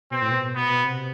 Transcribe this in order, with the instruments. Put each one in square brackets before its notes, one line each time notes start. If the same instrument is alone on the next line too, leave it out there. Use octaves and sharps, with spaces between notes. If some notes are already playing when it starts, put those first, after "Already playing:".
[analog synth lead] B2 [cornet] C4
[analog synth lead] A2
B2
[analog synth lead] B2 [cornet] B3
[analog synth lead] B2
C3